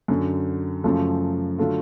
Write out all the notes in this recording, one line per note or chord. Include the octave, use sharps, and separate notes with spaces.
F#2 D3 F#3
F#2 C#3 F3 A3
D3 F#3 A3 F4